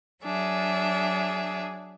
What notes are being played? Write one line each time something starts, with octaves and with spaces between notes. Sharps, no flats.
F#3 D4 G#4 E5